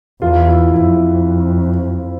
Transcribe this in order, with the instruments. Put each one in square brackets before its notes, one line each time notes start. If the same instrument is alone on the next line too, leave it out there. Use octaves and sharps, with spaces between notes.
[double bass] E2 [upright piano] F4
[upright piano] E4
[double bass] F2 [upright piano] E4